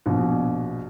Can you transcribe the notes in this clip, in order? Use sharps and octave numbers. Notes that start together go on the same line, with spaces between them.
A#1 B2